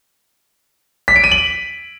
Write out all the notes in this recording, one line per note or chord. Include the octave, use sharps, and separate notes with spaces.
B6
D7
D#7
F#7